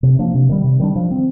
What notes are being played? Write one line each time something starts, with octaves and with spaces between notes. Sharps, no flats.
C3
F3 A#3 D4
C3
D#3 G3
C3
D#3 G3 D4
F3
C4